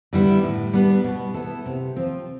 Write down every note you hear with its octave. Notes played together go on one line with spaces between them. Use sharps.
D3 G3 B3 E4
A2
G3 B3 D4
B2
B3 E4 A4
C3
F3 C4 F4